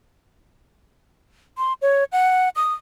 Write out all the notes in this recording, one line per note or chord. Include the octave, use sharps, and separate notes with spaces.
C6
C#5
F#5
D#6